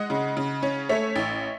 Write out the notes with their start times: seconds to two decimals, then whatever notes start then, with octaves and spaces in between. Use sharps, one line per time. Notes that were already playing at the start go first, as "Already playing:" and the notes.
Already playing: G#3 D#5 F#5
0.10 C#3
0.37 C#3
0.63 C#4
0.89 A3 C#5 E5
1.16 A1